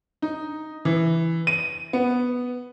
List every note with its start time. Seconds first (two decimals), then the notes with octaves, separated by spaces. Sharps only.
0.22 D#4
0.85 E3
1.47 D#7
1.93 B3